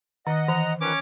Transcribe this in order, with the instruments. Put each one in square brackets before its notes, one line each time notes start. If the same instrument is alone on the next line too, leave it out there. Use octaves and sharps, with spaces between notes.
[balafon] D#3 [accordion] D#5 F#5
[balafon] E3 [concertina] A#5
[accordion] D#3 F3 B4 [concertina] C#4 C#5 D6